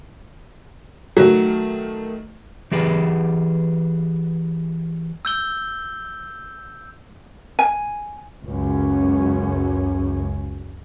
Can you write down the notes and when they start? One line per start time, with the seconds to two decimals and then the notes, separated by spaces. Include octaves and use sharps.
1.17 D#3 F#3 A3
2.72 E3 G4 G#4 B4
5.25 E6 G6 G7
7.59 G#5
8.44 C#2 F#2 C#4